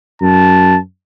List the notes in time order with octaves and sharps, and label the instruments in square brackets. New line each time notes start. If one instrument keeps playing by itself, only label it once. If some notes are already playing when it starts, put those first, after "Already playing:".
[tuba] F#2 [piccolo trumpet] A5